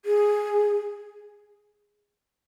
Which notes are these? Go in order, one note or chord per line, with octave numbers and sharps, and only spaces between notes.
G#4